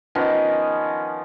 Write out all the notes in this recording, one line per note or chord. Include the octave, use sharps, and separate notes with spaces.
D#3 F3 B3 C#4